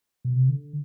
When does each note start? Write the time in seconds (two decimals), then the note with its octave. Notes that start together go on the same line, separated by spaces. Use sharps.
0.25 B2
0.36 C3
0.49 D3